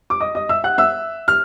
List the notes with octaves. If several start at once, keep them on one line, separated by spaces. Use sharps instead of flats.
D6
D#5 D#6
D#5 D#6
E5 E6
F#5 F#6
E5 E6
F6